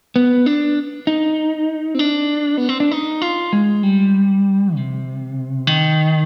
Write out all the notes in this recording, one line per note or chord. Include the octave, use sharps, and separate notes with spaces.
B3
D4
D#4
C4
D4
B3
C4
D4
D#4
F4
G#3
G3
C3
D#3